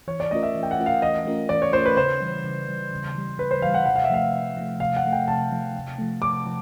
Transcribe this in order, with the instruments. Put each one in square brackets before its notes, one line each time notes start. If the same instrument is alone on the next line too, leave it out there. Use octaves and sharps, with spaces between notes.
[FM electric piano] E3 [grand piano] C#5
[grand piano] D5
[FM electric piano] A3 C#4 F4 A#4 [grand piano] D#5
[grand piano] E5
[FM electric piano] E3
[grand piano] G5
F#5
[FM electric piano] A3 C#4 F4 A#4
[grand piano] F5
[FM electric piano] E3 [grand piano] D#5
[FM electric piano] A3 C#4 F4 A#4
[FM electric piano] E3 [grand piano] D5
[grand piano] C#5
[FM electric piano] A3 C#4 F4 A#4 [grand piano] C5
[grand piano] B4
[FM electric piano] C#3 [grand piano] C5
[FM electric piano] E3 G3
C#3
E3 G3
C#3
E3 G3
[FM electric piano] C#3 [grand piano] B4
[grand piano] C5
[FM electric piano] E3 G3 [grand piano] F5
[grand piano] F#5
[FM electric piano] C3 [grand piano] F#5
[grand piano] F5
E5
[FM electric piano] F3 A3 [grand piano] F5
[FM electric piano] C3
F3 A3
[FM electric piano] C3 [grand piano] F5
[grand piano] F#5
[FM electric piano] F3 A3
[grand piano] G5
[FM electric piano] C3 [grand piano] A5
[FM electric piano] F3 A3
C3
F3 A3
[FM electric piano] C3 [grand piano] D6
[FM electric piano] F3